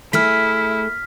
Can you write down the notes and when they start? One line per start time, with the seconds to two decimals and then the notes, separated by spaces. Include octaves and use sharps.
0.13 A3 E4 G#4 F6 B6